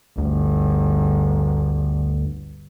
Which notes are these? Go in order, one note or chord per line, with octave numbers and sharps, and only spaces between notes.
G1 D2